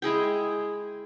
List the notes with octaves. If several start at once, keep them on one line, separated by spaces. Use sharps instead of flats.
G#3 E4 G#4 G5